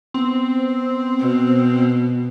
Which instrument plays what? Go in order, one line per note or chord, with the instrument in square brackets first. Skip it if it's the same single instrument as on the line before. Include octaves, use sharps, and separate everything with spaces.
[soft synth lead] B3 [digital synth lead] C4
[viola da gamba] B2